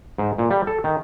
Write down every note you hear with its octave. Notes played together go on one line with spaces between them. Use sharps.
G#2
A#2
G3
A4
D#3